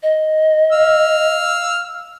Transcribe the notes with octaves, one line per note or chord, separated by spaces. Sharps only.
D#5
F5 E6 F6